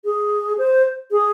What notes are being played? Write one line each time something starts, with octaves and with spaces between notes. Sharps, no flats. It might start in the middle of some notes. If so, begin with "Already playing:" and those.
G#4
C5
G#4